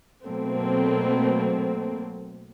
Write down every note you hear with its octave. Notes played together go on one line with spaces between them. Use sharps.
B2 F#3 A3 A#3 C4